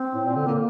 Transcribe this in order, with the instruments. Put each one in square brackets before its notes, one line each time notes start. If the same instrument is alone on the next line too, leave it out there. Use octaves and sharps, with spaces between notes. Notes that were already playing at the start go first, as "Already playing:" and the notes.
Already playing: [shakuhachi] C4
[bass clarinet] A2
A#2
D3
[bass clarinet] D3 [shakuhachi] A#3